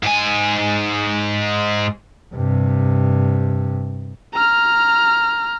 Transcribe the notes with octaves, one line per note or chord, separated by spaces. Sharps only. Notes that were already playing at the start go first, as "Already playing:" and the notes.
G#2 G#5
G2 C3
A#5 F6